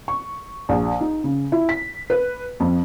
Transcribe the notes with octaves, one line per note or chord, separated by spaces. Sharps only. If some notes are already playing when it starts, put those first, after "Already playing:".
C#6
A#1
D#4
C#3
E4
B6
B4
F2